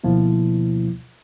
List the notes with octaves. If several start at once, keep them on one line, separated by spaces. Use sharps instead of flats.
D2 B2 F3 A#3 E4